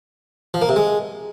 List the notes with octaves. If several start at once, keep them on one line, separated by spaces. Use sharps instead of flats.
F3
A#3
C3
G#3